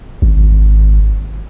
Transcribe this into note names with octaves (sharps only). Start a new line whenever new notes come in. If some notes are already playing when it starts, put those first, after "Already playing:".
G#1